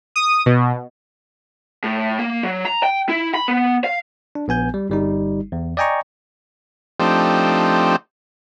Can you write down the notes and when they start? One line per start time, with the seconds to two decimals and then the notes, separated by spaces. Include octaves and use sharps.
0.16 D#6
0.46 B2
1.84 A2
2.19 A#3
2.43 F#3
2.65 A#5
2.83 G5
3.09 E4
3.34 B5
3.48 B3
3.84 F5
4.35 D4
4.48 A#1 B3 G#5 G6
4.74 G3
4.90 G1 G3 D#4
5.52 E2
5.77 D5 D#5 G5 G#5 A#5 C#6
7.00 F3 A3 C4 D4 D#4 G4